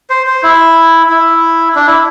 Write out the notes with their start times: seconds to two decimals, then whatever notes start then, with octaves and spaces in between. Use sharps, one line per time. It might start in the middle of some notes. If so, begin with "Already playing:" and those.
0.10 C5
0.27 C5
0.43 E4
1.09 E4
1.75 D4
1.87 E4